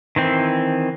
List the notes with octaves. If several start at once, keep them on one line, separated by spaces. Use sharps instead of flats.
D#3 E3 C4